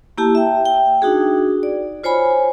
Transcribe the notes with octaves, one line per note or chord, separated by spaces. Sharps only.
A#3 E4 G4 A5
E5 G5
G5
D4 D#4 F#4 G#4
D5
F4 C5 C#5 G#5 B5